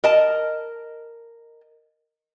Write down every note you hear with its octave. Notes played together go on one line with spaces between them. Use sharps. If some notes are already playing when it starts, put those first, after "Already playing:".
A#4 D#5 A5